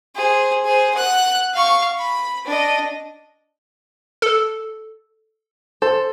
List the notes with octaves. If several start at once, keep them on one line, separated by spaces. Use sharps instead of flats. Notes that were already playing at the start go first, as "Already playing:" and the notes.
G#4 C5
G#4 C5
F#5 F#6
F5 C#6
B5
D4 D#5
A4
A4 C5